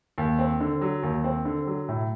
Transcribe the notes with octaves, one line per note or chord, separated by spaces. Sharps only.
D#2
C4
D3
F#3
D#2
C4
D3
F#3
A2